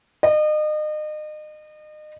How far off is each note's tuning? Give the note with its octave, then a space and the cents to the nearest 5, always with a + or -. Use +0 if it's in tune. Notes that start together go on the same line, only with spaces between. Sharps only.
D#5 -35